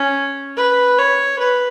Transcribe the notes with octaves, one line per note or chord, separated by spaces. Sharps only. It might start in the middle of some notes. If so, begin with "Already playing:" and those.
Already playing: C#4
B4
C#5
B4